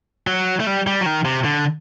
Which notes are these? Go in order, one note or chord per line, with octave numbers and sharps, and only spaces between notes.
F#3
A3
G3
G3
F#3
D#3
C3
D3